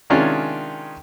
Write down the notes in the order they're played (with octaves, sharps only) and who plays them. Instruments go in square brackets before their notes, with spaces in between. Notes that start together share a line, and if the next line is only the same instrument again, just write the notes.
[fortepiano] C3 D#3 G#3 C#4 D4 F4